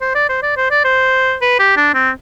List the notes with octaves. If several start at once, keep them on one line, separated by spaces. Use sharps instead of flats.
C5
D5
C5
D5
C5
D5
C5
B4
G4
D4
C4